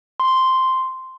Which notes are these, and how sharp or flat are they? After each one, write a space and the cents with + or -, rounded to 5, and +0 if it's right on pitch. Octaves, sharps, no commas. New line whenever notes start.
C6 -5